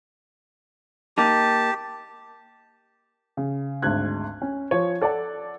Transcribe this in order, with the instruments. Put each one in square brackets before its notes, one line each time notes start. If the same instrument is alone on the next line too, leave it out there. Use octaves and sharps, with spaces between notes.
[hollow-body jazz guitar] A#3 D#4 [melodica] G4 [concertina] A5
[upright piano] C#3
G#1 D2 G#3 F#6 G#6
C#4
F3 C#5
A4 D5 F#5 A5